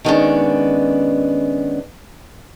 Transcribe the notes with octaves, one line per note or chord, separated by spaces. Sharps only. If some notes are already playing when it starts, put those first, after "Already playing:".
D#3 G#3 A3 B3 C#4 D4